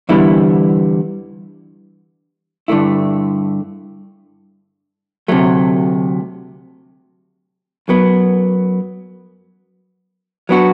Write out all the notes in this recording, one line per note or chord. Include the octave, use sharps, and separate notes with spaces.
E2 D3 G3 B3 E4
G2 D3 A3 E4
D2 C3 F#3 A3
F#2 F#3 B3
F#3 B3 D4 F#4